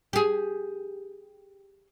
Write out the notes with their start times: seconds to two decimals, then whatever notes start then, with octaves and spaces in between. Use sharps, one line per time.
0.13 G4 G#4